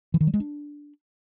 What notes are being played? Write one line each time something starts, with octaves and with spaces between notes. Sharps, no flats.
E3
D#3
G3
G#3
D4